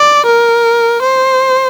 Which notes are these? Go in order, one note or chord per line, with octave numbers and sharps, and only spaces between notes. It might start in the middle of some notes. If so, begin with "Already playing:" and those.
Already playing: D5
A#4
C5